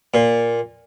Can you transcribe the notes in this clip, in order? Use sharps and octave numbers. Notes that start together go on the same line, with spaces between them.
A#2